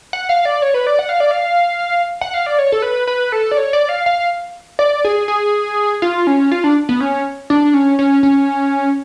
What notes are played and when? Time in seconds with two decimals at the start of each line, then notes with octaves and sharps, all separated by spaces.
0.13 F#5
0.29 F5
0.45 D5
0.62 C#5
0.74 B4
0.87 D5
0.99 F#5
1.09 F5
1.20 D5
1.31 F5
2.21 F#5
2.34 F5
2.46 D5
2.59 C#5
2.72 A4
2.82 B4
3.07 B4
3.32 A4
3.51 D5
3.57 C#5
3.73 D5
3.89 F5
4.06 F5
4.79 D5
5.05 G#4
5.28 G#4
6.02 F4
6.27 C#4
6.51 F4
6.64 D4
6.89 B3
7.00 C#4
7.50 D4
7.74 C#4
7.99 C#4
8.23 C#4